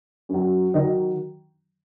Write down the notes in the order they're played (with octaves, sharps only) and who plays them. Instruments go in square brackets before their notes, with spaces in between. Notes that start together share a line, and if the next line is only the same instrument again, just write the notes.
[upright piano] F#2 F#3
D#3 F#3 D#4